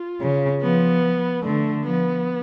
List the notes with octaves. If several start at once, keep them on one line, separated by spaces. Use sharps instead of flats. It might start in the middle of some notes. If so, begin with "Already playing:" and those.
Already playing: F4
C#3
F3 B3
D3 A3
F3 B3